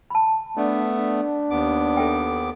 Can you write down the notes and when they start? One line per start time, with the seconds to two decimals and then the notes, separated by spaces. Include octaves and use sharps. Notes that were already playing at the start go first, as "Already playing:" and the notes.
0.10 A5 B5
0.57 A3 B3 D4
0.96 D4
1.51 D#2 B3 D6
1.97 A4 E5 G5